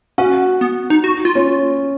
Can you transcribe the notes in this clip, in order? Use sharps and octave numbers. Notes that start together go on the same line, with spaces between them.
C#4 F#4
B3
D#4
F#4
F4
C#4